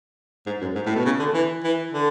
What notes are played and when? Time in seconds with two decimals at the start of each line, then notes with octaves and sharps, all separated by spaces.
0.46 G#2
0.61 F#2
0.75 G#2
0.86 A2
0.95 B2
1.05 C#3
1.19 D3
1.33 E3
1.64 E3
1.93 D3